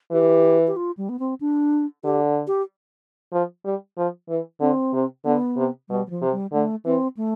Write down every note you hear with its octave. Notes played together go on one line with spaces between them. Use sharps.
E3 G4
G4
F4
G3
B3
C4
D4
D3 G4
G4
F3
G3
F3
E3
D3 C4
C3
D3 B3
C3
B2 G3
G3
F3
C3
G3
D3 A3
E3 C4
A3